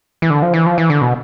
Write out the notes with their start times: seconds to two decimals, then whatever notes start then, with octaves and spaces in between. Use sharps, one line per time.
0.22 E3
0.30 D3
0.42 F3
0.54 E3
0.66 F3
0.78 E3
0.90 D3
1.02 B2